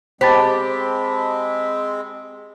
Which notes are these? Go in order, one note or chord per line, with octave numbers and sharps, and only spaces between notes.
G#3 C4 G4 C5 A5 B5 A6 B6